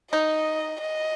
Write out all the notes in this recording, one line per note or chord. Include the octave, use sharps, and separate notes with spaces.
D#4 D#5
D#5